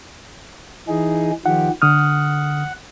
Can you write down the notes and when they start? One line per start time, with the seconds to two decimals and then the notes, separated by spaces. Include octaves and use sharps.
0.88 E3 D#4 G#4
1.46 D#3 F3 G4 F#5
1.82 D3 F#5 D#6 F6